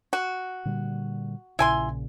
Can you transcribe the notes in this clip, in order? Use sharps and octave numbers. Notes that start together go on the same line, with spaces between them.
F#4
A#2 D3 G3
A#1 A#2 C#3 E4 G#5 C6